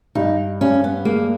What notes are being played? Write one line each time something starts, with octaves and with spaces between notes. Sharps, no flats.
G2 D#4
G2 C#4
B3
G#3 A#3